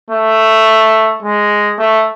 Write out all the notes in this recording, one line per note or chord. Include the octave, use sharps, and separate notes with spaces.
A3
G#3
A3